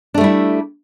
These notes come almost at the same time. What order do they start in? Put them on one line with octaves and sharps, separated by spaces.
D4 A3 G3 E4